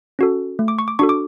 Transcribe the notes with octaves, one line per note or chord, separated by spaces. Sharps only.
C#4 F#4 A4
A3
D6
C#6
D6
D4 F#4 A4 C#6
D6